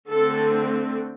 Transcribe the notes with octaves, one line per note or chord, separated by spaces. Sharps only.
D3 A3 C4 A4